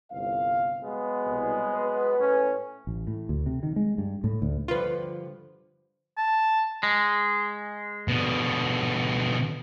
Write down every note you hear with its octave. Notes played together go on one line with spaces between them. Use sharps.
G1 C2 F5
F#3 G#3 B3
C2 B2
B4
A2 C#4
A1
A2
D2
C3
D#3
G#3
G2
A2
D2
G2 D3 F3 F4 B4
A5
G#3
B2 D3